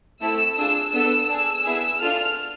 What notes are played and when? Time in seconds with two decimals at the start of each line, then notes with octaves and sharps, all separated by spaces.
0.21 A3 C4 E4 A4 E6
0.57 D4 F4 G#4 E6
0.93 B3 D4 A4 E6
1.28 D4 G#4 E6
1.64 B3 E4 G#4
2.00 D4 F4 A4 F6